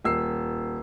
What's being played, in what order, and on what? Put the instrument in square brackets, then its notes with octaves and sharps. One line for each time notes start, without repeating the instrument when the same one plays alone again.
[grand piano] D#1 E6 C7